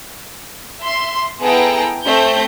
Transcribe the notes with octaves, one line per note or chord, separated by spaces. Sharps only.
E5 C6
B3 E4 G#4 A4 G5 A#5
A3 C4 G6